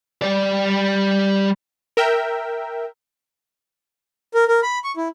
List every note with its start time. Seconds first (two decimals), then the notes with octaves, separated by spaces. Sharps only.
0.22 G3 D5
1.97 A#4 E5 G5
4.34 A#4
4.48 A#4
4.63 B5
4.84 C#6
4.97 E4